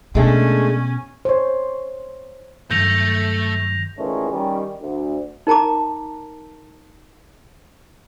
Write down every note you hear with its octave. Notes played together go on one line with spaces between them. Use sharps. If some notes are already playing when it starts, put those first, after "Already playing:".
B2 G#3 A3 C#4 D4
C5 C#5
G2 D#3 F#3 A3 G6 A#6 F7
A#2 D#3 E3 G#3 A3 C#4
D#3 G3 C#4
D2
D#4 A#4 A5 A#5 D6